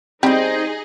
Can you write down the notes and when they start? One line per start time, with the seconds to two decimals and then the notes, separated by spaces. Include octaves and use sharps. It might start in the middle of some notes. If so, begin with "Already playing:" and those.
0.23 G3 C4 D#4 G#4 C5 D#5